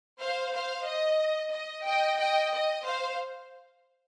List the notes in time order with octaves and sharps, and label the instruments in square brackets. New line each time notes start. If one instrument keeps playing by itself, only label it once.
[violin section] C5 F5
C5 F5
D#5
D#5
D#5 G5
D#5 G5
D#5
C5 F5